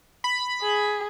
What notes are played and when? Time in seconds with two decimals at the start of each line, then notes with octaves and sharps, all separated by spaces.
0.24 B5
0.61 G#4